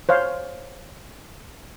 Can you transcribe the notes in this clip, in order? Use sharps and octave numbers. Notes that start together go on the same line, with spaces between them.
C5 C#5 F5